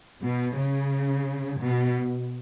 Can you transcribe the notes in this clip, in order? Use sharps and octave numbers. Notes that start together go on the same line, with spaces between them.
B2
C#3
B2